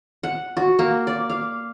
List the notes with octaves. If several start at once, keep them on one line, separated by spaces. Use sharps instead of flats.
F#5
F#4
A#3
D5
F5